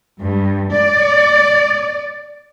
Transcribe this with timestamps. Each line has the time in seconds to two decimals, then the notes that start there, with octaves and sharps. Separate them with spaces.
0.21 G2
0.73 D5